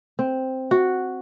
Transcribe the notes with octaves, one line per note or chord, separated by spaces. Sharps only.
C4
F#4